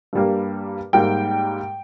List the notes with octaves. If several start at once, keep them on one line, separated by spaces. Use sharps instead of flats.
G2 G3 A#3
G#2 G3 A#3 G5